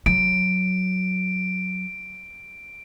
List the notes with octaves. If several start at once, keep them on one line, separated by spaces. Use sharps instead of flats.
F#3 D7